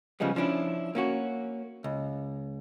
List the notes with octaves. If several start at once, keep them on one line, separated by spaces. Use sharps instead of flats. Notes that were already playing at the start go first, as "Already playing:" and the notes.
C#3 F3 G3 G#3 B3
F3 C#4 D4 E4
A#3 C#4 F#4
C#2